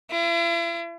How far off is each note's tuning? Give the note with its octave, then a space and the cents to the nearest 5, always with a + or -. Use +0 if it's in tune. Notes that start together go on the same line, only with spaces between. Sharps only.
E4 +45